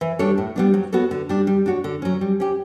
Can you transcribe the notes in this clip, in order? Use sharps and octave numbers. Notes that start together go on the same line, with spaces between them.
E3
G3 D4 A4 C#5
A2
G3 B3 D4
F#3
B3 F#4 A4 C#5
D3
G3 D4
G3
D4 F#4 C#5
D3
F#3 C#4
G3
C#4 G4